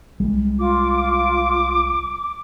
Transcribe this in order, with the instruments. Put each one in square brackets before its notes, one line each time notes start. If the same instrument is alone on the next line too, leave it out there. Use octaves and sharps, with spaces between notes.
[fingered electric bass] C2 G3 G#3
[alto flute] F4 [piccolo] D6